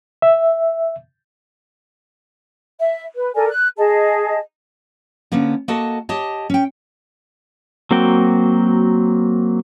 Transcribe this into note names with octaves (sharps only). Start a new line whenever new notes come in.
E5
E5
B4
A4 A#4 D5 G#5
F#6
G#4 D#5 A5
D3 A#3 B3 C#4
A#3 F#4 A4 D#5 A5
G4 C#5 D#5 A5
C#4 G5
F#3 A#3 C4 F#4 G5